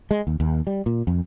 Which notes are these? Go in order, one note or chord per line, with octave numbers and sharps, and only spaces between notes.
G#3
D#2
D#2
G3
A#2
F2